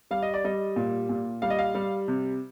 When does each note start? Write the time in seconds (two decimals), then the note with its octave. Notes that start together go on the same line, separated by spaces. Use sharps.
0.11 G3 F5
0.23 D#5
0.34 D5
0.44 G3 D#5
0.76 A#2
1.09 A#2
1.42 G3 F5
1.50 D#5
1.59 F5
1.75 G3
2.08 C3